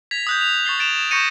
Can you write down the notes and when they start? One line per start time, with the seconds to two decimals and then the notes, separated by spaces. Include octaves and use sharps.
0.11 G#6 A#6 B6 F7
0.27 D#6 F#6 G6
0.41 F7
0.65 C#6 A6 C7 G7
0.79 A6 D7 E7 F7
1.11 C#6 G6 A#6 C#7 D#7